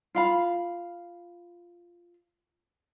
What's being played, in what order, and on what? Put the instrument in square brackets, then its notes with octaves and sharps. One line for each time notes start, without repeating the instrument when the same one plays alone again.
[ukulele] F4 F5 B5